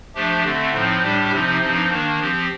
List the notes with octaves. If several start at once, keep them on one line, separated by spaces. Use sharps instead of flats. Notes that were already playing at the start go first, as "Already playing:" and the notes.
F3 A3 D4 G4
D3 A3 C4
A2 F3 C4 D#4
A2 G3 D4 G4
C3 F3 C4 D#4
G2 F3 C4 D#4
D#3 A#3 D4
F3 C4 G4